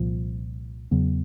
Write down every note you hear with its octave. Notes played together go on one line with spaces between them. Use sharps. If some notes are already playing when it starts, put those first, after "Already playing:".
Already playing: C2 A#2 F3
E2 C#3 F#3 B3